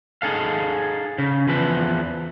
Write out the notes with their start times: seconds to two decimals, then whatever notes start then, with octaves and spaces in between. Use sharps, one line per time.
0.22 D#4 G#4 A4 F5
1.18 C#3
1.48 E2 F3 B4